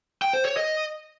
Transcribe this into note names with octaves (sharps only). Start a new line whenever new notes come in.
G5
C5
C#5
D#5